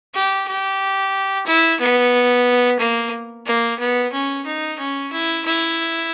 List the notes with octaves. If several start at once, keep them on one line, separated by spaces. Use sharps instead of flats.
G4
G4
E4
B3
A#3
A#3
B3
C#4
D#4
C#4
E4
E4